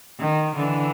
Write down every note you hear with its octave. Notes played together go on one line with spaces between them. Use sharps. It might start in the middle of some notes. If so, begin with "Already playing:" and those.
D#3
D3 E3